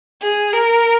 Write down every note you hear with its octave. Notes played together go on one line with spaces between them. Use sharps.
G#4
A#4